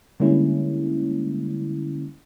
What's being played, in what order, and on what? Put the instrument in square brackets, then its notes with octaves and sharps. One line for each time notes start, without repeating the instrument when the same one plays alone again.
[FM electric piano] D3 G3 G#3 A#3 C#4 E4